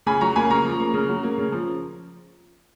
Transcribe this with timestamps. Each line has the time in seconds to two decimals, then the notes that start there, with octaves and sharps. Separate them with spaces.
0.06 C#3 G#5 B5
0.21 F#3 A#5 C#6
0.36 A#3 G#5 B5
0.50 C#3 A#5 C#6
0.65 F3
0.79 A#3
0.94 C#3
1.09 F#3
1.23 A#3
1.38 C#3
1.52 F3